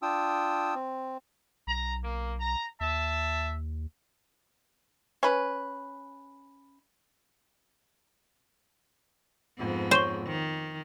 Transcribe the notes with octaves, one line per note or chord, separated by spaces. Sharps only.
D4 F4 G5 D#6 E6
C4
B1 A#5
A#3
A#5
D#2 E5 A5
C#4 B4
F2 G#2 B3
C5 C#5 C#6 G7
D#3